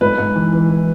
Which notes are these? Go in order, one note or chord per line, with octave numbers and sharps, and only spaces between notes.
G#2 B4
G#2
E3
E3
E3